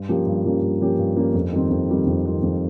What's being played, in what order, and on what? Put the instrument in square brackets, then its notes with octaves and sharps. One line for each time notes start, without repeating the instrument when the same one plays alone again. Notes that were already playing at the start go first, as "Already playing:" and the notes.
Already playing: [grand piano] G2
F3 A#3 C#4 G4
G2
F3 A#3 C#4 G4
G2
F3 A#3 C#4 G4
G2
F3 A#3 C#4 G4
F2
D#3 G3 C4
F2
D#3 G3 C4
F2
D#3 G3 C4
F2